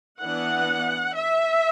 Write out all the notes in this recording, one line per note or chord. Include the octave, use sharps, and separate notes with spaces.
E3 B3 D4 F#5
E5